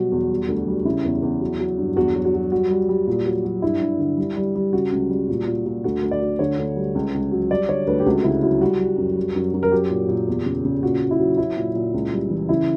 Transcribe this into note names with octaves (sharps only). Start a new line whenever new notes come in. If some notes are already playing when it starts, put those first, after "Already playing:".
Already playing: B2 F#3 G3 F#4
E2
G3
D2
G3
C#3 E4
E2
E2
F#3
F#3
G2
E2 F#4
F#3
F#4
F#3
G3 F#4
G3
G3
A#2
F#3
F#3
G2 E4
G2
D3
G3
G3
G3
C#3 F#4
C#2
G3
A#2
A#2
A#2
D2 F#4
D2
D5
D2
D3 C#5
D2
G3
C#2
C#2
F#3
G3 D5
D3 C#5
D2 B4
G4
C#2 F#4
C#3 E4
F#3 E4
G3 F#4
G3
F#2
G3
F#2
F#2
A#4
F#3 G4
A#2
A#2
E2
C#3
C#3
A#2 F#4
A#2
E4
F#3
F#3 E4
A#2
A#2
C#2
G3
E3
C#3 E4